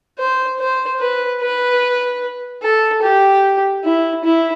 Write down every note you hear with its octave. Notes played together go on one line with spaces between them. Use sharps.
C5
C5
B4
B4
A4
G4
E4
E4